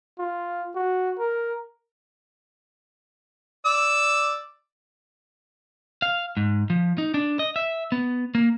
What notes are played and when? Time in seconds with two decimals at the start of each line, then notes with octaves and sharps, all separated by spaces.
0.19 F4
0.75 F#4
1.19 A#4
3.65 D5 E6
6.02 F5
6.37 G#2
6.70 F3
6.98 D#4
7.14 D4
7.39 D#5
7.56 E5
7.92 B3
8.35 A#3